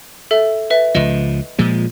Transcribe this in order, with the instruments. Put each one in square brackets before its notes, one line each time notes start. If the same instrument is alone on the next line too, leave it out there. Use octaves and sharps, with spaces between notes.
[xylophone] A4 E5
B4 E5
[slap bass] C#2 F3 [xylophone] D#5
[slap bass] A#2 F3 G#3